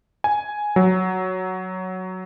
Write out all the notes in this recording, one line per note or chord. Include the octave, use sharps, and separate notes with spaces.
G#5
F#3